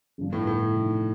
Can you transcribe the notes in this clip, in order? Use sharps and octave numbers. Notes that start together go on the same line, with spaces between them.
G1 G2 F3
A2
A2
C3 F3 A3 D#4